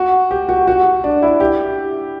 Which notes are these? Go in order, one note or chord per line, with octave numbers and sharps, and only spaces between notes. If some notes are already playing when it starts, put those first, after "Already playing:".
Already playing: F#4
G4
F#4
F#4
D4
E4
G4